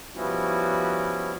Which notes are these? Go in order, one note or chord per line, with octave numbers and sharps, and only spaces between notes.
F3 G3 B3 C#4 E4 F#4